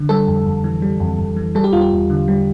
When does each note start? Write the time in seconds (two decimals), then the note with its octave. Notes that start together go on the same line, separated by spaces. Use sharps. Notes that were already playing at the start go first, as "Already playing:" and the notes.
Already playing: D3
0.09 G3 A4
0.27 F2
0.46 F2
0.64 E3
0.82 G3
1.00 F2
1.19 F2
1.36 E3
1.55 G3 A4
1.64 G4
1.73 E2 F4
1.81 G4
1.92 E2
2.10 D3
2.28 G3